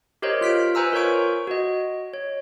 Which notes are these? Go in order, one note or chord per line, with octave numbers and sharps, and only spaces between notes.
G4 A#4 C5 C#5 D#5
F4 F6 B6 D7
B4 C5 G#5 A#5 E6
F4 A#4 C5 C#5 C#6 D7
F#4 D#5
C#5